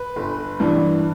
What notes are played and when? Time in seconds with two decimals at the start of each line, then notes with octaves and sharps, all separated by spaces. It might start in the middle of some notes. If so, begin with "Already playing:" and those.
Already playing: B4
0.16 G1
0.60 G2 E3